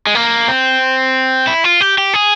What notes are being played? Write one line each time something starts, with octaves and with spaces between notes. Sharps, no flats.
G#3
A#3
C4
E4
F4
G4
G4
G#4